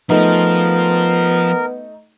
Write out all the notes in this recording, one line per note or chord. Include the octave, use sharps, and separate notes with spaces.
F3 A3 B3 D#4 A#4